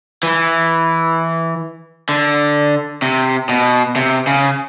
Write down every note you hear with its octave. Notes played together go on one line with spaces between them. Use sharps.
E3
D3
C3
B2
C3
C#3